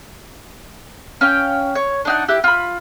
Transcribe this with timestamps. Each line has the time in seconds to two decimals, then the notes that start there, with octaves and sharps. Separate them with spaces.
1.21 C#4 F5 G5
1.75 C#5
2.05 D4 D#4 F#5
2.28 E4 G4 F#6
2.44 F4 B5